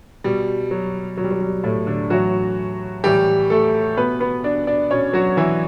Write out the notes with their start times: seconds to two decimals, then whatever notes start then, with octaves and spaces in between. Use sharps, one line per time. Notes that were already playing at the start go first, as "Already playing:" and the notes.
0.24 B2 G3
0.71 F#3
1.18 B2 F#3
1.24 G3
1.31 F#3
1.41 G3
1.64 A2 A3
1.87 D3 D4
2.10 A2 E3 F#3 F#4
3.04 A2 E3 G3 G4
3.50 A3 A4
3.97 B2 B3 B4
4.20 B3 B4
4.44 D4 D5
4.67 D4 D5
4.91 B2 C#4 C#5
5.13 F#3 F#4
5.37 E3 E4